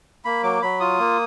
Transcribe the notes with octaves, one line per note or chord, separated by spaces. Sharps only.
A#3 B5
F#3 D6
F#3 B5
F4 D#6
A#3